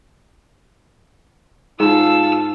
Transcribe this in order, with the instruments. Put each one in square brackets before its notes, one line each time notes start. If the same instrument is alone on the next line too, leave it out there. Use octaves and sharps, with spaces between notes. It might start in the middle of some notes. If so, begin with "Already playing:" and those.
[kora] G#2 [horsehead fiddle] F4 A5 [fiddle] E6